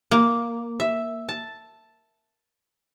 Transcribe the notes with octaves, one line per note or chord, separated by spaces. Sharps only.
A#3
E5
A5